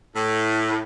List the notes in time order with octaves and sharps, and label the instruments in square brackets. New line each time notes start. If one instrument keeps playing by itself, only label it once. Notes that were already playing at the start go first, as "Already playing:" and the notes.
[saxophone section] A2